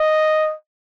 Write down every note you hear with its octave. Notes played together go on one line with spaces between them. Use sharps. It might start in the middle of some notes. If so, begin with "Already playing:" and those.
Already playing: D#5